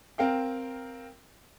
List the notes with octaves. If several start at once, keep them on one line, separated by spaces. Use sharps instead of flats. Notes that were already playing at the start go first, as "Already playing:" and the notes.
C4 A#4 F5 G5